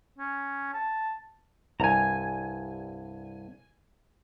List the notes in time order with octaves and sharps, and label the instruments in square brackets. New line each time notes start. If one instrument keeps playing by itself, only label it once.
[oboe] C#4
A5
[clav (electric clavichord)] C2 G2 [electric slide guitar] G#5 A#5